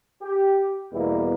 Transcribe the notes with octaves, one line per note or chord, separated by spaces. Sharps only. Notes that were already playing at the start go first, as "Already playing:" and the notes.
G4
E2 B2 G3 A#3 E4